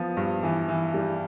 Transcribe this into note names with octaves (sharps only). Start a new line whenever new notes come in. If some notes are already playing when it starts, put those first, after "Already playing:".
Already playing: F3 B3 F4
G2
E3
E3
G3